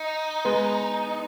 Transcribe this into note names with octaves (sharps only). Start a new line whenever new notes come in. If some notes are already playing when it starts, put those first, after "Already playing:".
Already playing: D#4
G#3 B3